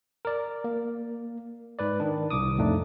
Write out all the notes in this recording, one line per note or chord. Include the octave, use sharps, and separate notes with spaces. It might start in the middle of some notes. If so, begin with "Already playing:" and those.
A#4 D5
A#3
G#2 B4 D5
D#3 D4
C2 D6 D#6
F2 A2 A3 D4 D#4